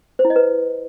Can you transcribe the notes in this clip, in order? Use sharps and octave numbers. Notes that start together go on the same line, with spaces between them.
C5
E4
D#5
B4